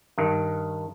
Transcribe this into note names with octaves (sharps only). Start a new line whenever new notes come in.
G2 D#3